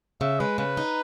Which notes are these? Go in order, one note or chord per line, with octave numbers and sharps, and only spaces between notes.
C#3 E5
G#3 B4
C#3 B4
D#4